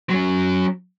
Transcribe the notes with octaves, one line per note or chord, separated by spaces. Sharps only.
F#3 C#4